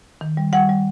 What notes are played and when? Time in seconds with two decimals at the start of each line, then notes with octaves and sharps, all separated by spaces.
0.21 D#3
0.37 G3
0.53 G3 F#5
0.69 G3